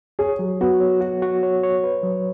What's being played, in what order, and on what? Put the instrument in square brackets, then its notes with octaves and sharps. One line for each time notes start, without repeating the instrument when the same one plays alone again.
[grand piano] G#4 [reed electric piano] C#5
[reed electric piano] F#3
[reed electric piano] B3 [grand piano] F#4
[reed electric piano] C#5
F#4
F#4
C#5
C#5
B4
F#3